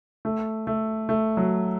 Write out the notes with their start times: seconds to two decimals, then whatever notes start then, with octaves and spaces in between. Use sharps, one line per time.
0.25 A3
0.67 A3
1.09 A3
1.37 F#3